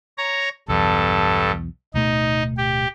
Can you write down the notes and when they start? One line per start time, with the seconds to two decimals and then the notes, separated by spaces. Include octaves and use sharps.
0.18 C#5 A#5
0.68 B1 E2 G2 A4
1.94 D1 B2 A3 D#4
2.58 G4